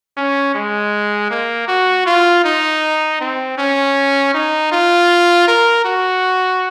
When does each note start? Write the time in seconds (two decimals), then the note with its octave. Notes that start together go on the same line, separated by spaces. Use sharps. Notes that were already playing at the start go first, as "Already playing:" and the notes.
0.17 C#4
0.55 G#3
1.31 A#3
1.68 F#4
2.06 F4
2.44 D#4
3.21 C4
3.58 C#4
4.35 D#4
4.72 F4
5.48 A#4
5.85 F#4